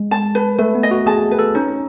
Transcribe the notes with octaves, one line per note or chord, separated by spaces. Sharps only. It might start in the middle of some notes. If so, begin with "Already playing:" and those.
Already playing: G#3
A5
B4
A3 B4
B3
D#5
F#4
G#4 A5
B4
A4
C#4 D#4